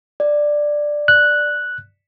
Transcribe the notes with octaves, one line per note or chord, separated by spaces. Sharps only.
D5
F#6